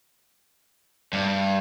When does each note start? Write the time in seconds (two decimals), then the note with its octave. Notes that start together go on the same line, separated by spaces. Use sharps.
1.13 G2